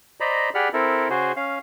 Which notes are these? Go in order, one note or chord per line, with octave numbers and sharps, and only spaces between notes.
C5 D5 D#5 A#5 B5
G4 G#4 D5 F#5 B5 F6
C4 E4 A4 A#4
C#3 F#4 G#4 C5
C#4 F5